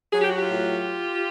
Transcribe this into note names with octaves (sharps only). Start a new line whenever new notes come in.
F#3 G#4
G4
F#4
F4 G4
A2